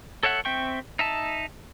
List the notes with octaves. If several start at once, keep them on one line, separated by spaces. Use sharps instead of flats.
A4 C#5 E5 F#5
C4 E5 G5 C#6
D#4 E5 A5